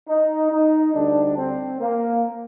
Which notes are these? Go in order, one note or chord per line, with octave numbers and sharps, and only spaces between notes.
D#4
D#4
D2 D3 G3 D4
C4
A#3